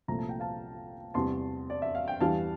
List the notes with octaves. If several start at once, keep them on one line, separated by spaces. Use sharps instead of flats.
C2 A#2 F3 A3 A#5
A5
G5
F5 A5
E2 C3 G3 A5 C6
D5
E5
F5
G5
E2 E3 G3 F5 A5